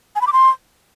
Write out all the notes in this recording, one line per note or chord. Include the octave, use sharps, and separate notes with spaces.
G#5
B5
D6
C6